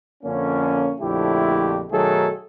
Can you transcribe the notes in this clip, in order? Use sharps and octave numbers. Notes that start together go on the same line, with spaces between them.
F2 D3 A#3 C#4
A#1 F2 D3 A3 E4 G4
B1 D#3 F#3 A3 G#4 A4